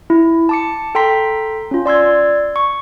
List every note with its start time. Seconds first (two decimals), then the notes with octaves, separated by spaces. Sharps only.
0.10 E4
0.49 A5 D6 C#7
0.95 A4 G5 A#5 C6 B6
1.71 C#4 F4
1.86 D5 C6 E6 G#6
2.56 C#6